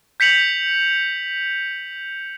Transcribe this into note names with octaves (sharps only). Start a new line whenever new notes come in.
G6 B6 C#7 F7 F#7